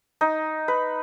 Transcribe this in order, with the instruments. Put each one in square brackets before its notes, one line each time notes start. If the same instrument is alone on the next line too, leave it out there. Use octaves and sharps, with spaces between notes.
[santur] D#4
B4